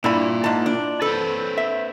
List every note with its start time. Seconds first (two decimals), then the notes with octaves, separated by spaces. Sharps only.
0.04 G2 A#2 E4 D5 B5
0.44 G#2 A5
0.66 D4
1.02 C4 A4 B4
1.57 E5